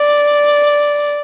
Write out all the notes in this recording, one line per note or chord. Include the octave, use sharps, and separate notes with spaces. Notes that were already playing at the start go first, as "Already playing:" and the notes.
Already playing: D5